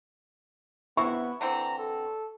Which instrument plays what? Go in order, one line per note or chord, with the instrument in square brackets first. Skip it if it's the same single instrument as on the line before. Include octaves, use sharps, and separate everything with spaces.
[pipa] C3 E4 [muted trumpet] B3 [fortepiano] C#6
[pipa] D3 E3 C4 [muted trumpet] A#5
[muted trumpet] A4